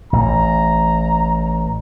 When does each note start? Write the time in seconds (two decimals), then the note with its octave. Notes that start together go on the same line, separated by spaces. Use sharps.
0.13 A1 A#5